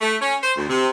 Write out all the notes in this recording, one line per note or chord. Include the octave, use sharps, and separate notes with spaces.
A3
C#4
C5
D2
C3